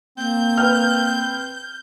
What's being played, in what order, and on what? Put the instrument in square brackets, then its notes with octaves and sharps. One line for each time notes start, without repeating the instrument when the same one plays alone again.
[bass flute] A#3 [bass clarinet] C4 [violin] G6
[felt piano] B4 G5 F6